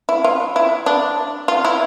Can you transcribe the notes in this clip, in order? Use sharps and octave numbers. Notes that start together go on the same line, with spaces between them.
E4
F4
E4
D4
F4
E4